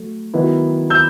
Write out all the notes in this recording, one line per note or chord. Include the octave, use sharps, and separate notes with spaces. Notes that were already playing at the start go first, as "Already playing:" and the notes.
Already playing: F#3 A3
D#3 F#3 B3 E4
E6 G6